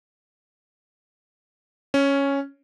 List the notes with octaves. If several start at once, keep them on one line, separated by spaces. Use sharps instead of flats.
C#4